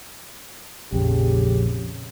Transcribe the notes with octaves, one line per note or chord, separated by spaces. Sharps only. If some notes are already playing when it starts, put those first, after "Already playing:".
A#1 F2 C#3 G4